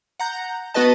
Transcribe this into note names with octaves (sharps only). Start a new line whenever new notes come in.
F#5 A#5 G6
B3 F#4 B4 D#5 A5